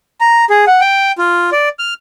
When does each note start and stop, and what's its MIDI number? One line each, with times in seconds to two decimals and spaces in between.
0.20 0.45 82
0.50 0.65 68
0.67 0.80 78
0.81 1.12 79
1.18 1.50 65
1.52 1.69 74
1.79 1.94 89